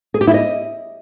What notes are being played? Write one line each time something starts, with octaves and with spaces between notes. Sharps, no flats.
G#4
G4
E4
D#5